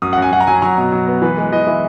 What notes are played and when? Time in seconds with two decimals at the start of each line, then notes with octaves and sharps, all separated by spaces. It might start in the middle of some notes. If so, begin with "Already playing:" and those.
0.02 F#2 D#6
0.13 F#5
0.17 F#2 G#5
0.32 F#2 F#5
0.40 A#5
0.47 F#3 G#5
0.62 F#3 A#5
0.78 B2
0.92 F#3
1.07 B3
1.22 E3 B4
1.37 G#3 B4
1.52 E3 D#5
1.67 E3 E5